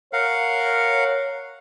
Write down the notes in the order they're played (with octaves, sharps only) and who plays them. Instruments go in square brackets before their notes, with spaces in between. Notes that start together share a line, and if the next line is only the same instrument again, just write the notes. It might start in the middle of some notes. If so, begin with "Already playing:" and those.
[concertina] A#4 F5 F#5 [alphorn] C#5